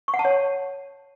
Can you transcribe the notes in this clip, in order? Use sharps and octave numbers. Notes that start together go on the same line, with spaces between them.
C#6
F#5
A5
C#5